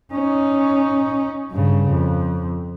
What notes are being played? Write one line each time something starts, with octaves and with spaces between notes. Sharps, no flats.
C#4 D#4
G2 C#3
F2